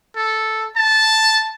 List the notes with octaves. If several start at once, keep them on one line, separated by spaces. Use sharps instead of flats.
A4
A5